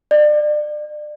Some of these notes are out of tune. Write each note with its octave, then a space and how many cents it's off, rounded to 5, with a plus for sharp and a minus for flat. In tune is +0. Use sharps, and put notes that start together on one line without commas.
D5 +30